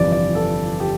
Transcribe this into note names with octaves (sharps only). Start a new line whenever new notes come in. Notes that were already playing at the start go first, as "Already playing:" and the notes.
Already playing: G1 F2 C3 E3 D5
D5
A4
G4